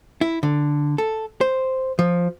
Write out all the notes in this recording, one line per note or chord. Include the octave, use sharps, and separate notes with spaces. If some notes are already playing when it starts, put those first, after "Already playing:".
E4
D3
A4
C5
F3